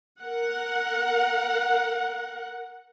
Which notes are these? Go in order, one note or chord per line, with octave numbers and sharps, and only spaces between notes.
A#4 F#5